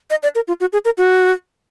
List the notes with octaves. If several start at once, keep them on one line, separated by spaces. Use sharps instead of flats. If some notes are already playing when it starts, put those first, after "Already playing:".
D#5
D5
A#4
F4
F#4
G#4
A#4
F#4